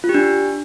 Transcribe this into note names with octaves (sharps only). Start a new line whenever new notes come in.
F4
G4
D4